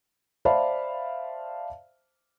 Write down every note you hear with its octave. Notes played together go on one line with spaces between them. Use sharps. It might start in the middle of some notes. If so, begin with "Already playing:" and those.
C5 D5 E5 F5 A5 B5